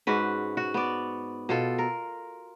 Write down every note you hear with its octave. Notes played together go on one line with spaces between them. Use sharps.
G#2 C#4 F#4 B4
F#4
B3 D5
B2 F4 A4
A#4